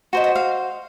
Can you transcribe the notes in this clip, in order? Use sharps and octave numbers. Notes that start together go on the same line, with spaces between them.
F#4 C5 D#5
D#5
F5